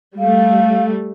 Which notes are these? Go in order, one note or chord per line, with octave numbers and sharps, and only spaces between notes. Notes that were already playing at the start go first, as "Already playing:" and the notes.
G3 A3 F5